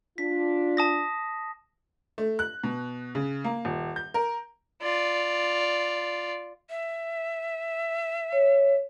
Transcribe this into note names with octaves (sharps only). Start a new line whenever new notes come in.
D4 F4 B6
A5 D#6 A#6
A3
F#6
B2
C#3
A#3
D#1
G6
A#4
F4 D5
E5
C#5